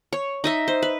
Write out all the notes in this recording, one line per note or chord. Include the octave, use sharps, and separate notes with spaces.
C#5
D#4 D#5 E5
C5
B4